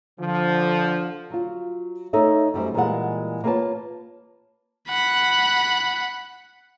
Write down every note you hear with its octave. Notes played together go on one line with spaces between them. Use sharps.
D3 F3
F#3 F4
A3 D#4 A4 C#5 E5
F#2 G3 A3 C5
A#2 E3 G3 G#3 F5 F#5
A#3 F4 G#4 B4 C#5 A5
F#5 B5